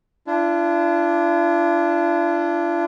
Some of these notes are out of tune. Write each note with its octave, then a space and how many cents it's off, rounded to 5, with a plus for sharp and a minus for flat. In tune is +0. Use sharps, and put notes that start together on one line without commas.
D4 +0 F4 -45